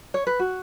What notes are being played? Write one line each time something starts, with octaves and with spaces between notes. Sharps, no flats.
C#5
B4
F#4